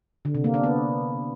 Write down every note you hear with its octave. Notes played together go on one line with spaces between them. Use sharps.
D3
C3
A#3
D4
B3